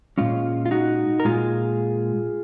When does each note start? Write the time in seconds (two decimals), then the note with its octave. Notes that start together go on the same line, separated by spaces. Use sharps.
0.18 A#2 G#3 C#4 F4
0.66 F4
0.71 D#4 F#4
1.20 A#4
1.25 A#2 G#3 F4 G#4